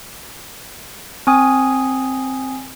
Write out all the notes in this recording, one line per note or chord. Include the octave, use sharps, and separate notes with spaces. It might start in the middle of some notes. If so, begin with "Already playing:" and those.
C4 G#5 D#6